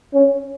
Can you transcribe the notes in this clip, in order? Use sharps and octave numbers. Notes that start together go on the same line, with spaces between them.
C#4